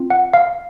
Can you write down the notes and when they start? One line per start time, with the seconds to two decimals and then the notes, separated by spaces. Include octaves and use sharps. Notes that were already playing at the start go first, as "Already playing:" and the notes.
Already playing: C4 F4
0.10 F#5
0.34 F5